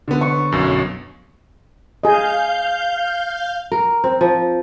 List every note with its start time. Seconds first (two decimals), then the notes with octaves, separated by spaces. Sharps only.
0.08 D3 B3
0.21 C#6
0.52 B1 F#2
2.03 G#4 D#5 F5 G6
3.72 A#4
4.04 C4
4.21 F3